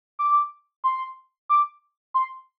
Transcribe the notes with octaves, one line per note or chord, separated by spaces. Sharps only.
D6
C6
D6
C6